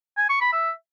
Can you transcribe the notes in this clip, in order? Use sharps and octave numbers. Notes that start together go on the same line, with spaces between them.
G#5
C#6
B5
E5